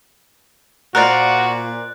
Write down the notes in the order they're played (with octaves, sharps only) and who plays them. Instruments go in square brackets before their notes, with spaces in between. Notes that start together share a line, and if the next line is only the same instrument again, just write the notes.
[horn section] A#2 [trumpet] F#4 [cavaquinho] A#4 C5 D5 [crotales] F#6